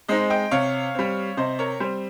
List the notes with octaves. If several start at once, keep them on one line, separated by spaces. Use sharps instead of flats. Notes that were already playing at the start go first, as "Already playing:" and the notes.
G#3 C4 D#4 C5 D#5
D#5 G5
C3 C#5 F5
G3 C4
C3 C5 D#5
A#4 C#5
G3 C4 C5